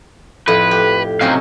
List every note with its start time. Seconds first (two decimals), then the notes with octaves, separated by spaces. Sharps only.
0.48 F2 A2 F3 B4
0.71 G4
1.21 C3 F#3 C4 C#4 D#4 F5